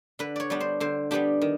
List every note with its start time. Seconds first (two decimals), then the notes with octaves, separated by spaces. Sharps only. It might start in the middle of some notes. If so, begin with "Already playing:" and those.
0.19 D3 B4
0.36 C#5 D5
0.50 G3 B3 D4
0.60 C5
0.80 D3 C5
1.11 G3 B3 D4 G4
1.42 D#3